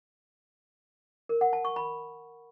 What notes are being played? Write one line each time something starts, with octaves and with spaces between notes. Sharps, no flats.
A#4
F#5
A5
C#6
B5